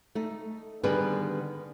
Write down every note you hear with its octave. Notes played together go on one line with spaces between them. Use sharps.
A3 D#4
D3 D#3 G3 B3 G#4 B4